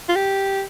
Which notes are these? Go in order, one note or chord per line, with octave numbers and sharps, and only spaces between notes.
F4
G4